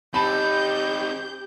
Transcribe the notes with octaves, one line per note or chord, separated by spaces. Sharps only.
C4 D#4 G4 A5 B5 G6